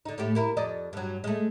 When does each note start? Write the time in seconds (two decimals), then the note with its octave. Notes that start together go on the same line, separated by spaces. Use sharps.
0.05 D3 D#4
0.18 A2 A3 G4
0.35 A#3 E4 A#4
0.57 F2 D5 D#5
0.93 G2 F#3
1.24 G#3 A3